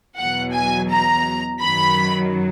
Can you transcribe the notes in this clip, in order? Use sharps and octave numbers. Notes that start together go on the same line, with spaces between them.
E2 B2 F#3 F#5
G#5
A#5
F#2 D#3 F#3 B5